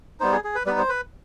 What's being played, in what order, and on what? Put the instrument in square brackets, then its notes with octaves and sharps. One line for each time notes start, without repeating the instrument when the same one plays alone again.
[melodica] G3 B3 D#4 C5
G#4
G#4
B4
G3 B3 D#4 B4
C5
B4